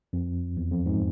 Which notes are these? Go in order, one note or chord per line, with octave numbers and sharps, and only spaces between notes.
F2
E2
F2
G#2